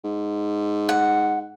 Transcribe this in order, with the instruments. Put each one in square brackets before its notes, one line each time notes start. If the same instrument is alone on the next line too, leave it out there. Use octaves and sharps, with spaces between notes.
[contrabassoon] G#2
[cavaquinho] F#5